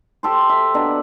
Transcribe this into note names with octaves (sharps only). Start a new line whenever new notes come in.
G4 A4 C5
E5
B2 D4 F#5 A#5